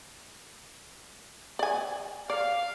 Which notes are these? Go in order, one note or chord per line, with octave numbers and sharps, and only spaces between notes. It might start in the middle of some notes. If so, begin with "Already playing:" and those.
D5 G#5
D5 F5